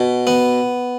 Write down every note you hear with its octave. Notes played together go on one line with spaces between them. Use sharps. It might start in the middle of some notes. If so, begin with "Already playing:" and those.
Already playing: B2
B3